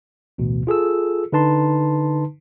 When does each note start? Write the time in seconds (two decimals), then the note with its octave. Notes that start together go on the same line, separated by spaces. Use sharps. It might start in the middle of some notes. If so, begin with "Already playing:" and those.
0.38 A1 D2 B2
0.67 F4 G#4 A4 E6
1.32 D3 D#4 B4 A5 C6